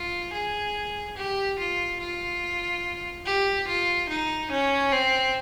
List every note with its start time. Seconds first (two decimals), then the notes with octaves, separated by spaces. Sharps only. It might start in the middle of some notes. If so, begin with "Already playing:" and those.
Already playing: F4
0.33 G#4
1.17 G4
1.59 F4
2.00 F4
3.26 G4
3.67 F4
4.09 D#4
4.51 C#4
4.92 C4